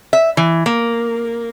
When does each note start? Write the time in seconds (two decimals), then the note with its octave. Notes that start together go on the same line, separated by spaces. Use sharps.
0.13 E5
0.37 E3
0.66 A#3